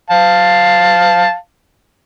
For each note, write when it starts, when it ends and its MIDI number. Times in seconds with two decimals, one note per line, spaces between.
0.10 1.34 77
0.10 1.34 81